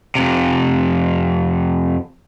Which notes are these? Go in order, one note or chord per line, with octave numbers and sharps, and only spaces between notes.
F2 C3